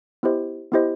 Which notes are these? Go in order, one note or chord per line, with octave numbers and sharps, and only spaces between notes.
B3 E4 G4 C5 D#5
B3 E4 G4 C5 D#5